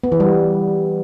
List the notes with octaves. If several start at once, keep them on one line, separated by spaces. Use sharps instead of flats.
B3
E3
G3